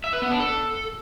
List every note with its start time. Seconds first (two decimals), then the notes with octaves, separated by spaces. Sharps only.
0.04 E5
0.13 B4
0.22 B3
0.31 D4
0.40 A4